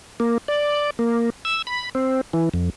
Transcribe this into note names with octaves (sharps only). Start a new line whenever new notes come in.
A#3
D5
A#3
E6
B5
C4
E3
F2